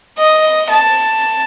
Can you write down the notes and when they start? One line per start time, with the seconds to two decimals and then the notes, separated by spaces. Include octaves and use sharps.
0.18 D#5
0.70 A5